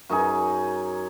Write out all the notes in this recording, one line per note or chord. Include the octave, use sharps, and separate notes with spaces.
F#2 D#4 G#4